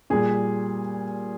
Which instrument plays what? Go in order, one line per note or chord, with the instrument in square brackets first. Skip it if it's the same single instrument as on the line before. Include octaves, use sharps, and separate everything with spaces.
[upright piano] A#2 G3 G#4